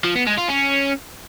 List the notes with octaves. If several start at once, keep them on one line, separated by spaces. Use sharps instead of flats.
F3
B3
G#3
F4
C#4